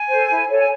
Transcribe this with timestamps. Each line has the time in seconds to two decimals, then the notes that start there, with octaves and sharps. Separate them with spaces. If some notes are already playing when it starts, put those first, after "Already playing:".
Already playing: G#5
0.10 A4 C5
0.30 E4
0.49 A4 C#5
0.56 G#5